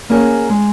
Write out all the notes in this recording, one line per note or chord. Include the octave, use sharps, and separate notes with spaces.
A#3 C#4 G#4 C#5
G#3